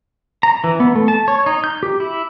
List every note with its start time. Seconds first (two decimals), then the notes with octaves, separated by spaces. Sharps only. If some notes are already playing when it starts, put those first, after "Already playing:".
0.43 A#5
0.64 E3
0.80 B3
0.95 A3
1.08 A5
1.28 C#5
1.46 D#4
1.64 G6
1.83 G4
2.00 E4